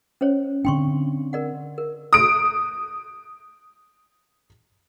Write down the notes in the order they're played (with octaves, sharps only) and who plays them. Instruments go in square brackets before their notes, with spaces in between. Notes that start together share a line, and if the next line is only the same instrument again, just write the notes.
[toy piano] C#4 C5 C#5
[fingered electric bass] D3 C4 D4 [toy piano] G5 C6 C#6
[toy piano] A#4 D5 F#5
A#4
[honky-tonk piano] D#6 D7